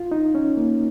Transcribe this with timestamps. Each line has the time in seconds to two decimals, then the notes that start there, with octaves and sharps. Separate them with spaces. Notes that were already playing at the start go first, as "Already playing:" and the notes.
Already playing: F4
0.12 D#4
0.35 C#4
0.57 A#3